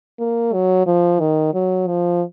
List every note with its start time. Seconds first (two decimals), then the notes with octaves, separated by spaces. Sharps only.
0.19 A#3
0.53 F#3
0.86 F3
1.20 D#3
1.54 F#3
1.87 F3